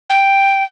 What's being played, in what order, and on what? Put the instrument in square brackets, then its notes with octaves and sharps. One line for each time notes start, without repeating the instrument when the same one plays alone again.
[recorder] G5